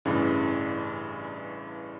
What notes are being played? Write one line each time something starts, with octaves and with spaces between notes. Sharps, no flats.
A1 G2 C#3 E3